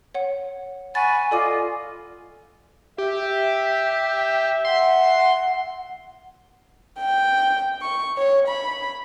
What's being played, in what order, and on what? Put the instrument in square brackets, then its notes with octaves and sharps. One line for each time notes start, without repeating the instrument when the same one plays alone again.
[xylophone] C#5 F#5
[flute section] F#5 B5 C#6 [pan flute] G#5 [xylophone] A6
[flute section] F4 D#5 [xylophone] A4 D5 D6
[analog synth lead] G4 [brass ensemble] E5
[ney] F#5 [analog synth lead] C6
[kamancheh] G5
C#6
C#5
B5